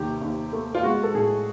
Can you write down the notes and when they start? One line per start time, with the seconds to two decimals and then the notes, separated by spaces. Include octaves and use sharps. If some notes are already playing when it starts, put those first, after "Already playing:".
Already playing: D#2 C3 G4
0.21 D#2
0.53 A3
0.75 F4
0.83 G#3 F#4
1.03 A4
1.15 A2 G#4